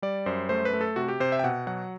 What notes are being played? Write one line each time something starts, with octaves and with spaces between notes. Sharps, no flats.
G3 D5
F#2 C5
A3 C5
B4
A3
A4
C3 F#4
G4
C3 C5
E5
G5
B2 F#5
F#3 F#5